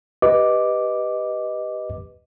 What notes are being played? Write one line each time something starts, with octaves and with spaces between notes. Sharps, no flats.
G4 B4 D#5 D6